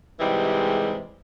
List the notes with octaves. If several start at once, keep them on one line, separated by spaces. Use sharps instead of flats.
G#2 C3 E3 G3 G#3